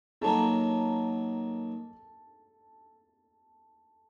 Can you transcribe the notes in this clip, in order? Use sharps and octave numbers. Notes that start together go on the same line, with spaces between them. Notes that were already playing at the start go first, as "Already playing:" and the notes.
D#3 F#3 A#3 A4 A5